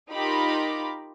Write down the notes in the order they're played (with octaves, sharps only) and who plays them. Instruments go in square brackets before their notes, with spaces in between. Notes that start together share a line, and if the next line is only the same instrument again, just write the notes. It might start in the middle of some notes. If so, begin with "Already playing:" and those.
[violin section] D#4 F4 G4 A#4 B5 D6